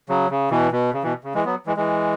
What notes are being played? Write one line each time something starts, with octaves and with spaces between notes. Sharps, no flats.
C#3 F#3
C#3
B2 E3
B2
C#3
B2 E3
C#3
E3 G#3
F#3 B3
E3 G#3
E3 G#3